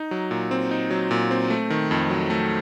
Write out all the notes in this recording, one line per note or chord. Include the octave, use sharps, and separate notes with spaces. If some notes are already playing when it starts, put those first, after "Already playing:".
Already playing: D#4
F#3
A#2
C4
D#4
F#3
A#2
C4
A3
D#3
F2
F#3
A3